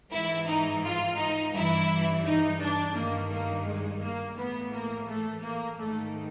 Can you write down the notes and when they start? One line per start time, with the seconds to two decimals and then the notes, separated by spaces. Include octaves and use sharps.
0.12 G#2 E3 E4
0.48 D#4
0.83 F4
1.19 D#4
1.54 G2 E3 E4
2.25 D#4
2.60 D4
2.95 G2 D#3 A#3
3.31 A#3
3.66 G#3
4.02 A#3
4.36 A2 E3 B3
4.72 A#3
5.08 A3
5.43 A#3
5.78 G#2 D#3 A3